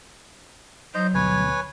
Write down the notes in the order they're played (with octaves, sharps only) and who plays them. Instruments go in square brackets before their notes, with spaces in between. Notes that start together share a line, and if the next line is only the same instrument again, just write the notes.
[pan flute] F#3 [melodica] D#4 C5
[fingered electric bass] D2 B2 [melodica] B4 C#5 G#5